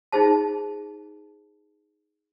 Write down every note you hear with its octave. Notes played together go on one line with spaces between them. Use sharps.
D#4 F4 G#4 C5 A5